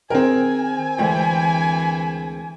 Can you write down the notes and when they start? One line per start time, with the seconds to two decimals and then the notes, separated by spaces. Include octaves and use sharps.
0.10 D#3 C4 G#4 A#4 G5 G#5
0.98 D2 E3 G#3 G5